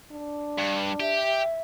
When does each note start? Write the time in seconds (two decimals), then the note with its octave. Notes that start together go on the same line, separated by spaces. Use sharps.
0.12 D4
0.58 G2
1.00 G4 E5